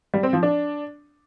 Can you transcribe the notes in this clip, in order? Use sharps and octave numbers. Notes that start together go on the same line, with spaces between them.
G3
C4
F3
D4